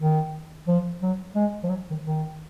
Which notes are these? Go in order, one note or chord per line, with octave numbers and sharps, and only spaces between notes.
D#3
F3
F#3
G#3
F3
F#3
D#3
D#3